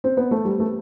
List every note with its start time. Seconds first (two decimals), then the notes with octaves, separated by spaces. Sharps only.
0.04 C4
0.17 B3
0.31 A3
0.45 G3
0.60 A3